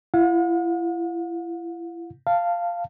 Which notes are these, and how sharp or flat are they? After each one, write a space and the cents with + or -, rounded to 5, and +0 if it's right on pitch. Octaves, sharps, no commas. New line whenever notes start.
E4 +35 F#5 -45
F5 -10 A5 +10